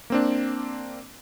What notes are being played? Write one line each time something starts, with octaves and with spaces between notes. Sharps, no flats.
A#3 C4 D4